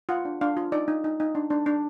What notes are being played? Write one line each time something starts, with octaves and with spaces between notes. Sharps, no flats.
F4 F#5
D4
D4 F5
F4
D#4 D5
D#4
D#4
D#4
D4
D4
D4